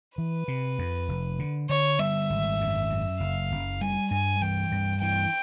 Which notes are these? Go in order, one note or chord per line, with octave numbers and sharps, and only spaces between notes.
E3 B4
C3
F2
F1
D3
D3 C#5
G3 E5
G#1
F#2
F#2
F#1 F5
F#1
G3 G#5
G2 G#5
E3 G5
G2
E3 G5